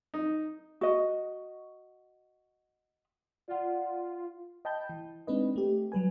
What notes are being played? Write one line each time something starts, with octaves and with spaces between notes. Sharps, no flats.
D#4
F#4 D#5
F4 D5 F#5
D#5 G5 A5 B5 G6
E3
G#3 C4 D4 D#4 B4 D#5
A3 G4
F#3 G3 B4 G#5